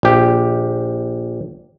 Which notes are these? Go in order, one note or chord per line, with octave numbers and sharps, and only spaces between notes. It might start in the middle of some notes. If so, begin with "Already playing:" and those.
A#1 G4